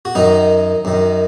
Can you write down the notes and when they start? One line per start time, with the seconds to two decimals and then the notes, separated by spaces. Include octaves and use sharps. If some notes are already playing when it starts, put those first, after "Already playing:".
0.05 F#4
0.15 F#2 D#3 D#4
0.85 F#2 D#3